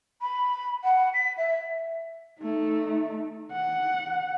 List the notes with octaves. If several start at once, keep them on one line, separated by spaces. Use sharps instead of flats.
B5
F#5
B6
E5
A3 D#4
F#5